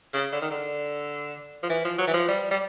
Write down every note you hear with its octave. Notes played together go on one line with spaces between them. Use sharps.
C#3
D3
D#3
D3
F3
E3
F3
F#3
E3
F3
G3
G3